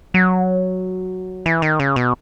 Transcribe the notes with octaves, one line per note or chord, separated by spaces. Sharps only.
F#3
E3
D#3
C#3
B2